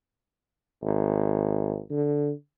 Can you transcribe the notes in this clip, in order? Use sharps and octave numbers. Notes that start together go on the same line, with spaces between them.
G#1
D3